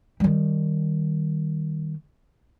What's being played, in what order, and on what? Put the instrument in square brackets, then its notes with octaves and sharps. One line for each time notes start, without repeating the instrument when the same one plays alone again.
[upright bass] D#3 G3